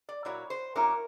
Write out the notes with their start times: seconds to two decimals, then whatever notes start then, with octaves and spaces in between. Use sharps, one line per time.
0.09 D5
0.25 A#2 F#3 A#3 E4 C#5
0.50 C5
0.75 A#2 F#3 A#3 C#4 E4 A#4